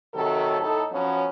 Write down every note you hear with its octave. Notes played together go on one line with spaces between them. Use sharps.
C3 D#3 F#3 A4
A2 D#4 A4
F3 F#3 B3 C#4